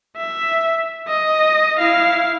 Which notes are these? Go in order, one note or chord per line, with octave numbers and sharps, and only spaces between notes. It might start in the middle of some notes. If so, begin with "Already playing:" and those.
E5
D#5
E4 F5